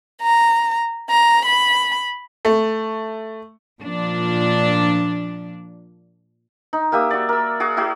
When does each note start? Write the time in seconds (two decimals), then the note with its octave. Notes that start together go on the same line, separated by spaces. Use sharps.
0.22 A#5
1.10 A#5
1.45 B5
2.45 A3
3.81 A#2 F3 D4
6.73 D#4
6.92 A#3 G4 E5 D#6
7.11 F#4 D5
7.29 A#4 E6
7.60 F#4 G#4 D6
7.77 E4 F#4 G#4